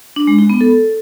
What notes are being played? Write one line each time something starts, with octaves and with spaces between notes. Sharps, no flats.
D4
G#3
D#4
B3
A4